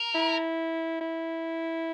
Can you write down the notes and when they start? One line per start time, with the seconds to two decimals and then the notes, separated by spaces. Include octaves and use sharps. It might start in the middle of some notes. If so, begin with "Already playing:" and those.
Already playing: A#4
0.15 E4
1.01 E4